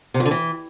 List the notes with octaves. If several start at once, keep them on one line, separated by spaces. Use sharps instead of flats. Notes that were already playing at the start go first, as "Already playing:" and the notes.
C3
F2
D3
E3